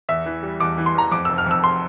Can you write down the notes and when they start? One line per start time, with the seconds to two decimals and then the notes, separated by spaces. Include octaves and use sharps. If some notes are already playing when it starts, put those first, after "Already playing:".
0.09 E2 E5
0.26 E3
0.43 G3
0.60 E2 D6
0.77 E3
0.86 C6
0.95 E2 A#5
1.12 F2 D6
1.25 F1 E6
1.38 F6
1.46 F2 E6
1.64 C6